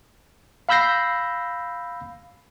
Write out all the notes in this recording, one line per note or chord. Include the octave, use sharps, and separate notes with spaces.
F5 B5 E6 G6 A#6 C7